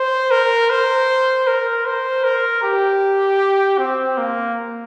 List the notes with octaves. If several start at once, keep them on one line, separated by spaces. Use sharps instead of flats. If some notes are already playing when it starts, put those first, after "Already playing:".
Already playing: C5
A#4
C5
A#4
C5
A#4
G4
C4
A#3